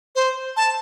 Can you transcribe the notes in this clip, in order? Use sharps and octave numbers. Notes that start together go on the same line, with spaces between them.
C5
A5